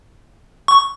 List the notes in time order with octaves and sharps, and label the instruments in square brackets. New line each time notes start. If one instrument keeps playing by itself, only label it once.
[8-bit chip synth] C#6